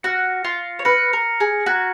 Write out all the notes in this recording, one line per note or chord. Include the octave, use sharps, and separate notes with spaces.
F#4 F6 A#6 C#7
F4
C#5
B4 F6 A#6 C#7
A#4
G#4
F#4 A#5 F6 G#6 B6